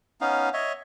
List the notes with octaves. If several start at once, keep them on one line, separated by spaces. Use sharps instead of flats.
B3 C#4 D#4 F5
C#5 D#5 E5